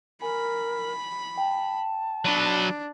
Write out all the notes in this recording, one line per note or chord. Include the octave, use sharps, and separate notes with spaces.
A#4 G#5 B5
G5 A5
F#3 D4 B4 D7